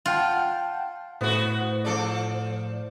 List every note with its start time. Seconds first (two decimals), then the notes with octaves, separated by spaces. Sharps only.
0.06 F4 F#5 G5 A5
1.21 A2 B3 F#4 C5
1.85 F3 A4 D5